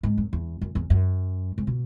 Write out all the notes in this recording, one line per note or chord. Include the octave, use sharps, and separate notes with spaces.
G#2
F#2
E2
F#2
E2
F#2
G#2
B2